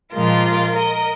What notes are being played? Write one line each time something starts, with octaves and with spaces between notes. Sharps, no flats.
A#2 F3 G#3 F4 A#4
A#4 D#5